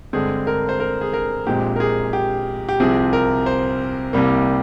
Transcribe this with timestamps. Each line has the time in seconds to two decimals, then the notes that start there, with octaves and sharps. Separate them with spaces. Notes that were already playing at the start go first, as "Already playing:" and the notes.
0.13 G2 D3 G#3 C4 G#4
0.47 A#4
0.69 C5
0.80 A#4
1.01 G#4
1.13 A#4
1.47 A#1 A#2 G#3 C4 G4
1.76 A#4
1.80 G#4
2.13 G4
2.69 G4
2.80 C2 C3 F3 C4 G#4
3.13 A#4
3.46 C5
4.13 C2 C3 G3 A#3